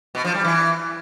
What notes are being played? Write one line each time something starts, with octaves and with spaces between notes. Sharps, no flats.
B2
F3
G3
E3